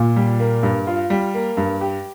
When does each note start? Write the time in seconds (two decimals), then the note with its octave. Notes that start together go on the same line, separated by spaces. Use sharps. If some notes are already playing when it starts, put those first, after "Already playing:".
Already playing: A#2 F4
0.16 G3
0.40 A#3
0.63 G2
0.87 F4
1.10 G3
1.34 A#3
1.57 G2
1.81 G4